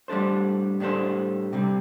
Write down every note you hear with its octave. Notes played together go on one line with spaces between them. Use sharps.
A2 G3 D4 A4 C5
A2 G3 D4 A4 C5
C3 G3 C4